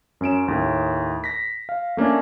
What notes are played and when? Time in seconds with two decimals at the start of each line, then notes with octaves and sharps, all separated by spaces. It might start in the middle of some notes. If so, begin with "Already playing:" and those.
0.21 F#2 C#4 D7 E7
0.48 D#2 A2
1.24 A#6 B6
1.69 F5
1.97 A3 A#3 C#4 D4